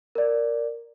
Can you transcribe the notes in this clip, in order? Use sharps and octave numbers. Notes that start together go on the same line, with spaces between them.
A#4 D5